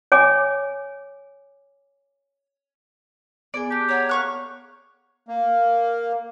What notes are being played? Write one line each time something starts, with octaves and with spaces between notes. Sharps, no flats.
C#5 G#5 D6
B3 G#4 D5 G#5
G4 A5 F#6
C#5 F#5 A#5
F5 C#6 F#6
A#3